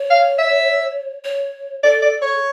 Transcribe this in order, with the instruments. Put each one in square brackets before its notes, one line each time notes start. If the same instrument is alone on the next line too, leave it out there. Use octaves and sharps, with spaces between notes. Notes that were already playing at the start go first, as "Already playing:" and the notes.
Already playing: [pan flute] C#5
[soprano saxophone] F5
E5
[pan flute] C#5
[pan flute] A4 [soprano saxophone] D5
[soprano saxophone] D5
C#5